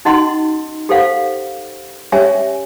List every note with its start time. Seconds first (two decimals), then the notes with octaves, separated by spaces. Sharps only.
0.05 C#4 D#4 F#4 D#5 F#5 C6
0.89 G4 A4 C5 F5 F#5
2.12 C#4 G4 C#5 E5 G#5